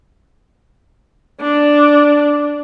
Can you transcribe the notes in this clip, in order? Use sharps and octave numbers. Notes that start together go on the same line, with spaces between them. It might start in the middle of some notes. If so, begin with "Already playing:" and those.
D4